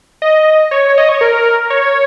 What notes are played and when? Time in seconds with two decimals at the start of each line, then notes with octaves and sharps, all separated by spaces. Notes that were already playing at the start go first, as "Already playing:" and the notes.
0.22 D#5
0.71 C#5
0.98 D#5
1.09 C#5
1.21 A#4
1.70 C#5